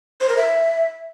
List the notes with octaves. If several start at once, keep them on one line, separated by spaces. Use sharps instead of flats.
C5
A#4
E5